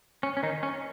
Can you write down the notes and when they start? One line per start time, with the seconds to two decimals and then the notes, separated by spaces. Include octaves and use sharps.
0.23 C#4
0.37 C#4
0.43 D#3 D#4
0.63 C#4